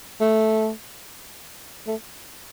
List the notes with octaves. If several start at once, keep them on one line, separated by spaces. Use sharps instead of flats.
A3
A3